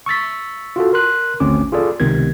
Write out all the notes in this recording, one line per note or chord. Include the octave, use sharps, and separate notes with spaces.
C#6 E6 A6 B6
F4 F#4 A4
A#4 C6 F#6
G#1 D2 C4 C#4 D6
F4 G#4 A4 D5
C#2 C3 D#3 B3 G#6